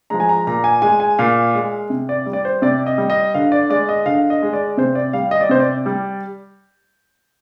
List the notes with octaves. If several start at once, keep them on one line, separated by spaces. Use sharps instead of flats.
F3 G#3 A#5
G#5
A#5
A#2 A#5
G#5
G#3 G#5
G#5
A#2 F5
G#3
C3
D5
G3
D5
C5
C3 D5
D#5
G3
D#5
D3 F5
D5
G#3 D5
D#5
D3 F5
D#5
G#3
D5
C3 C5
D5
G3 F5
D#5
D5
C3 C5
D5
G3